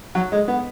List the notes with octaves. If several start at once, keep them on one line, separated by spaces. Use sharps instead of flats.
F#3
G#3
B3